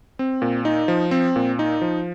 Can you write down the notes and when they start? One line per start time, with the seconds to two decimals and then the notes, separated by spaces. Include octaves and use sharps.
0.19 C4
0.42 A#2
0.65 D#4
0.88 F3
1.11 C4
1.36 A#2
1.59 D#4
1.81 F3